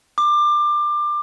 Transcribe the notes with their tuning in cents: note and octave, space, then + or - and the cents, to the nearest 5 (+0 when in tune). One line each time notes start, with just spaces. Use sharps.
D6 +25